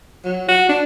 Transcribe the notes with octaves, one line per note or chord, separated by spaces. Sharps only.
F#3
F#4
D4